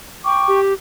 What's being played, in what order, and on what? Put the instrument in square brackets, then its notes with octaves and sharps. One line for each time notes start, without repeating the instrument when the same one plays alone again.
[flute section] G5 C#6 D6
[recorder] G4